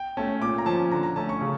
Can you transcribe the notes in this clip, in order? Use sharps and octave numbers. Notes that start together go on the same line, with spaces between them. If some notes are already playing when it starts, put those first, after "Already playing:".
Already playing: G5
A3 C#4 A5
A#2 D6
A#5
F3 C#4 A5
D3 A#5
A#5
A3 C#4 A5
C#6
C#3